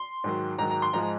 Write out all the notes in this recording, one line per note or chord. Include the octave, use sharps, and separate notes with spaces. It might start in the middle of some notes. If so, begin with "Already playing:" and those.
Already playing: C6
G#2 D#3 F#3
G#2 D#3 F#3 A#5
A#5
C6
G#2 F3 G#3 A#5